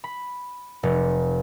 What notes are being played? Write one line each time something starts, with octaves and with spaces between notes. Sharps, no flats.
B5
F1